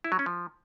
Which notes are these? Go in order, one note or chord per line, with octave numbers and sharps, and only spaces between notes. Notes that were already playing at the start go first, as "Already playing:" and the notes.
E4
F#3
C#4
F3